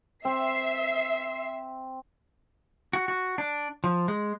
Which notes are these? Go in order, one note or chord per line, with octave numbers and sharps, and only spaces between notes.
C4 E5 C7
F#4
F#4
D4
F3
G#3